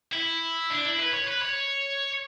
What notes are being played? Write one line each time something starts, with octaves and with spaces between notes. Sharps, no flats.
E4
D4
E4
B4
C#5
B4
C#5